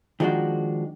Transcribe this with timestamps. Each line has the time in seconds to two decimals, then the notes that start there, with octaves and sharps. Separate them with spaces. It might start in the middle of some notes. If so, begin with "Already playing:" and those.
0.20 D#3 F3 G#3 D4 F#4